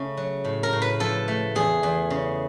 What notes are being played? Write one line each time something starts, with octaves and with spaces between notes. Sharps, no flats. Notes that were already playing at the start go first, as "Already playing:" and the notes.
Already playing: C#3 A3
F#3
A2
A#4
A2
B4
F3 A4
A3
E2 G#4
E2
C#3